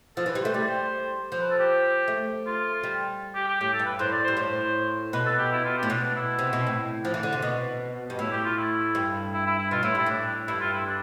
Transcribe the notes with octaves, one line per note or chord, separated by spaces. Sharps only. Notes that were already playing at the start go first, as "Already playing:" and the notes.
F3 A4
E3 B4
G3
A3 C5
G3 D5
C5
F3 C5
B4
A4
G4
A3
F4
G3
G4
G4
A2 G4
A4
G2
B4
A2 C5
D5
C5
G2
A2 C5
B2 B4
A4
G4
E4
F4
G4
A2
B2 D4
D4
E4
C3
B2
A2
F3 D4
E3
D3
C3
B2
G2
A2 E4
G4
F4
E4
G2
E4
E4
E4
B2 F4
A2 E4
G2 E4
A2 D4
G2 E4
F4
E4
D4